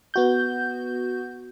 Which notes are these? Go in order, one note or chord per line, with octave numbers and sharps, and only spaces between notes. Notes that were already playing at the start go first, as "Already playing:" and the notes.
B3 F#4 G6